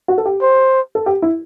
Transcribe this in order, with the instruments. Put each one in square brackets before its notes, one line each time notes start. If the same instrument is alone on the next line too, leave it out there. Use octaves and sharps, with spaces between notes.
[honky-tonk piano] F#4
A4
G4
[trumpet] C5
[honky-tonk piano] A4
G4
E4